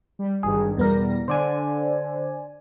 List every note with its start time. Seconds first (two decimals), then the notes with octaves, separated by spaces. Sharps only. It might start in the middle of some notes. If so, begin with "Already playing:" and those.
0.19 G3
0.43 G#1 G2 D#3 G#4
0.77 E2 B2 G3 B3 A#4 A#6
1.28 D3 C5 D5 G#5